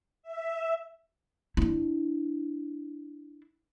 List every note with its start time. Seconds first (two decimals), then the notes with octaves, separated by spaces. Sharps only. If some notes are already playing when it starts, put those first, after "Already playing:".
0.23 E5
1.57 D4 E4